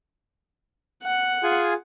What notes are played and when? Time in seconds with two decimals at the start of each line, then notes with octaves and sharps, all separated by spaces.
1.03 F#5
1.43 F4 G#4 G#5